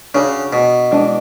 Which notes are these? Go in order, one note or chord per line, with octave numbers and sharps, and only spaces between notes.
C#3 D4 F#4 C#5
B2
E3 G#3 D4